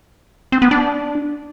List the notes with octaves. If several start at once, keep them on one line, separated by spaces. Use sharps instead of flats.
C4
B3
D4